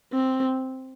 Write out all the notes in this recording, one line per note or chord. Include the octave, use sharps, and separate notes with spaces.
C4